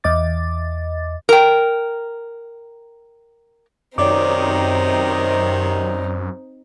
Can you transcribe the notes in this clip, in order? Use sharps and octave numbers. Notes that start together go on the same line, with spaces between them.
E2 D#5 D6 A6
A#4 G5
F#2 C3 D#3 C4 D#4 C#5 D5 D6